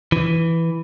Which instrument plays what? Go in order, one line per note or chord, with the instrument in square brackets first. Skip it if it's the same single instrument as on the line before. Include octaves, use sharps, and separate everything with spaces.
[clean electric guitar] E3